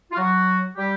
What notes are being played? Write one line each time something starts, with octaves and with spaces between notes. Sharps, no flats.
F4
F#3 F#4
G3 G4